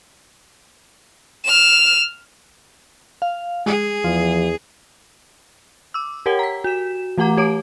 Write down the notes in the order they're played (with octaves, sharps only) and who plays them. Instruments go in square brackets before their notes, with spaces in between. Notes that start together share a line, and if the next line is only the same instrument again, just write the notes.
[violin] F6 E7
[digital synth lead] F5
[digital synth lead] G#3 [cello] G#4
[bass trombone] E2 [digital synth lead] F3
[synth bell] D6 E6
G4 A#4 C#5 F#5 G5
A#5 B6
F#4 E7
E3 A3 G4 F#5 A#5 D6
G4 C#5 D6 D7